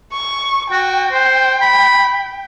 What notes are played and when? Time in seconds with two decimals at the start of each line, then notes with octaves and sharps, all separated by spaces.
0.13 C#6
0.72 F#4 G5
1.12 C5
1.62 B5